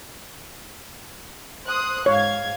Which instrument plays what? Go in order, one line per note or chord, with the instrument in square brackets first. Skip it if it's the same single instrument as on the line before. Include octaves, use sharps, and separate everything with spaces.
[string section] C5 D#6 F#6
[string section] G#2 F5 G#6 [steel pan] C#5